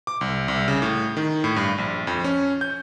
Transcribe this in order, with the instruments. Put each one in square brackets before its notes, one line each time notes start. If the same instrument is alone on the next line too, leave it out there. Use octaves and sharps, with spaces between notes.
[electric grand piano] D6
C2
C2
C#3
A2
D#3
A2
G2
A#1
F2
C#4
G6